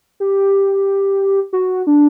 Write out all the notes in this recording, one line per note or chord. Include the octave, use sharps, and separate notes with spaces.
G4
F#4
D4